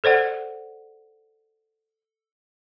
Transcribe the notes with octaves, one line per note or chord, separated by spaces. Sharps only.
A4 C5 D5 F#5